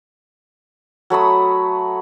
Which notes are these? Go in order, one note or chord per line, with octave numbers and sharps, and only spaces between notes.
F#3 A3 B5 D#6